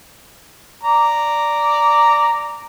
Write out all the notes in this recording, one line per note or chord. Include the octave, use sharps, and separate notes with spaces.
D5 A#5